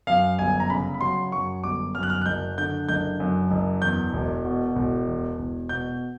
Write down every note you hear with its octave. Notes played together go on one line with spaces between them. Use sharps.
F#2 F5
G1 G#5
A#5
C#3 B5
B5
F#3 C6
F#2 C#6
G1 D6
F#2 F6
F#6
F6
F#6
F#1 G6
D3 G6
F#1 G6
F#2
F#1
E2 G6
E1
B2
E1
E2
E1
B2 G6